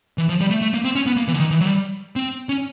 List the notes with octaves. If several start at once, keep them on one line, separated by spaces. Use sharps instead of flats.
E3
F3
G3
A3
A3
A#3
C4
C#4
B3
A#3
E3
D3
D#3
E3
F#3
G3
C4
C#4